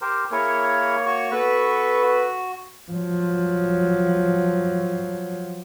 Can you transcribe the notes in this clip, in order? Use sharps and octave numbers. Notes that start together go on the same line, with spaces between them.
G4 A#4 C5
A#3 E4 G#4 A#4 C#5
F#4 C#6
B3 A4 B4
F#4
F3 F#3